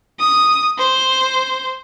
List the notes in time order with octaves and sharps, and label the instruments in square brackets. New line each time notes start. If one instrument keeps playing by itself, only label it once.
[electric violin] D#6
C5